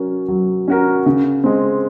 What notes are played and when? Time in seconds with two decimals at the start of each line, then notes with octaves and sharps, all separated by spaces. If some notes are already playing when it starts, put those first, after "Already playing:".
Already playing: F#3 C#4 F#4 A#4
0.28 F#3
0.68 C#4 F#4 A#4
1.06 C#3
1.44 G#3 C4